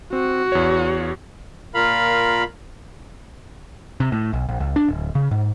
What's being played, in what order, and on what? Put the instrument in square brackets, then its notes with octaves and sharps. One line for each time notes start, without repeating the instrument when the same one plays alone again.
[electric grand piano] C4 [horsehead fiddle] F#4
[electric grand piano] E2 C#5
[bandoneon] A#2 F5 B5 [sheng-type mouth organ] F4 A#4
[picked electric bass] C3
A2
B1
A#1
C#2
D4
D1
C#3
G#2